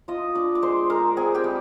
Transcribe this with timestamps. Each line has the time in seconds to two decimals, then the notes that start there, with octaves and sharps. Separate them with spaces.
0.08 F4 D#5 D#6
0.35 D4 D5 D6
0.55 D6
0.62 G#3 C5 C6
0.89 G#3 A#4 A#5
1.17 C4 G#4 G#5
1.35 G4 G5
1.44 G3